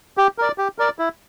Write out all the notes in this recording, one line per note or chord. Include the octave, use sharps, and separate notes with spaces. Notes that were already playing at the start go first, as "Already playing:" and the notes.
G4
A#4 D5
G4
A#4 D5
E4